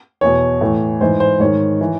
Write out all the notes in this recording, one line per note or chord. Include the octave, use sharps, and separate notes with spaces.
E2 B2 C#5
A2 E3
G#2 E3 C5
C5
G#2 D#3 C#5
E3